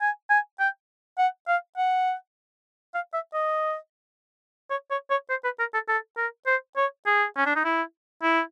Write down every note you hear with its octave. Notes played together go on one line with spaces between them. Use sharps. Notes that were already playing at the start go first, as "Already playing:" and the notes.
G#5
G#5
G5
F#5
F5
F#5
F5
E5
D#5
C#5
C#5
C#5
C5
B4
A#4
A4
A4
A#4
C5
C#5
G#4
C#4
D4
D#4
E4
E4